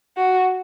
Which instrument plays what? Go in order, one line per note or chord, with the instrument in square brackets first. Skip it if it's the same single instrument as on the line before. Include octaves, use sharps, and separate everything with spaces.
[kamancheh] F#4